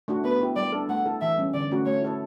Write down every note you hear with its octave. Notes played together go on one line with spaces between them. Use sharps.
A3 D4 F#4
B3 B4
E4 G4 B4
G3 D5
D4 A4
A3 F#5
E4 A4
E3 E5
G3 C#4
D3 D5
A3 C#4 F#4
A3 C#5
E4 A4 C#5